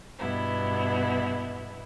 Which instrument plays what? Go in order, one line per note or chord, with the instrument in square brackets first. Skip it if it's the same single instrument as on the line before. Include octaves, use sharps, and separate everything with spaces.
[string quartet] G2 B2 B3 E4